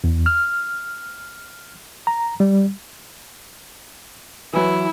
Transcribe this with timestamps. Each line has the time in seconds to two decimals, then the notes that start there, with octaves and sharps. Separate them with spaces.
0.04 E2
0.26 F6
2.07 A#5
2.40 G3
4.53 E3 F#3 E4